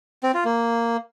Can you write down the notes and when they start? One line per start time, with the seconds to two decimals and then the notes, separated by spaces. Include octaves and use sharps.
0.23 C4
0.34 F4
0.45 A#3